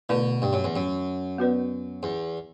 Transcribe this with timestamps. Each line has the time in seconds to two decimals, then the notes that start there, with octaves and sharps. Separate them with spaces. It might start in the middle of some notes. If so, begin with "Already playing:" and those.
0.09 B2 D3 A3 E4 B4 D5
0.42 G2
0.53 F#2
0.64 E2
0.76 F#2
1.38 B3 F#4 B4 D5
2.03 E2